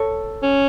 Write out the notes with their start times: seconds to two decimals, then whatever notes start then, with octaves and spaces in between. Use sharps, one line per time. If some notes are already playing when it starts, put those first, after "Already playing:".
Already playing: A4 C#5
0.43 C#4